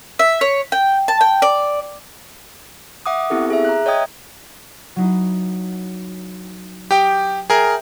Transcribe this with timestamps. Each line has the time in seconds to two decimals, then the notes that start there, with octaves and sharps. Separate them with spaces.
0.19 E5
0.41 C#5
0.72 G5
1.08 A5
1.21 G5
1.42 D5
3.06 E5 F#5 D6 D#6
3.30 B3 C4 E4 G4 A4
3.50 G#4 E5
3.65 A#5 F#6
3.86 C#5 D#5 E5 G5 D#6 G#6
4.96 F#3 D#4 E4
6.91 G4 G5 D#6
7.50 G#4 A#4 E5 G5